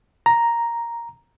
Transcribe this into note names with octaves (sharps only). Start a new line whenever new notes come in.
A#5